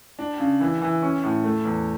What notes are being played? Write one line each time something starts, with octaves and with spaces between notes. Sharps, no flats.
D4
C#3
E3
E3
C#4
A2
A3
E2